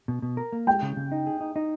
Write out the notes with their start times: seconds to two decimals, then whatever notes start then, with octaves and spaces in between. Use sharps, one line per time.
0.08 B2
0.22 B2
0.37 A#4
0.53 A#3
0.67 G#3 G5
0.82 C#3
0.97 C#3
1.12 D#4
1.27 G#4
1.41 D#4
1.56 D#4